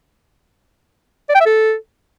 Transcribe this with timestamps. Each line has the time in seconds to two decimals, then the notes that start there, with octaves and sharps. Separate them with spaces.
1.29 D5
1.35 G5
1.40 E5
1.46 A4